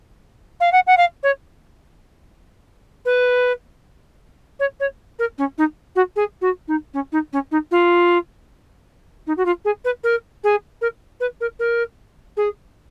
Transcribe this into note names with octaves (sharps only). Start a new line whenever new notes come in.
F5
F#5
F#5
F5
C#5
B4
C#5
C#5
A#4
C#4
D#4
F#4
G#4
F#4
D#4
C#4
D#4
C#4
D#4
F4
D#4
F#4
F4
G#4
B4
A#4
G#4
A#4
B4
A#4
A#4
G#4